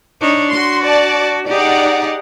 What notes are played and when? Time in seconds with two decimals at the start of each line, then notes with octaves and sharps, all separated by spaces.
0.20 D4 D#4 C#5
0.52 F#4 C6
0.83 D5 A5
1.48 D#4 G4 G#4 D5 F#5